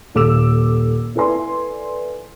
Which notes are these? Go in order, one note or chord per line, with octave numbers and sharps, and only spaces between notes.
D#1 A4 D6 E6 E7
E4 A4 B4 D5 G#5 C6